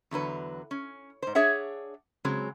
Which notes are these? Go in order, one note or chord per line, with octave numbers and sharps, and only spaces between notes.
E2 D3 F#3 B4
C#4
G#2 C5
D4 G#4 C#5 E5 F#5
C#3 F#3 G#3 C4